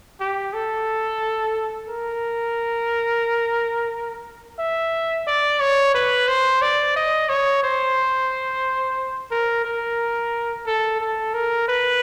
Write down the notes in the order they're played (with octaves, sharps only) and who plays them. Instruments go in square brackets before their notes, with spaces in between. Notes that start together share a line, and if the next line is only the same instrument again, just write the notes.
[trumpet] G4
A4
A#4
E5
D5
C#5
B4
C5
D5
D#5
C#5
C5
A#4
A#4
A4
A4
A#4
B4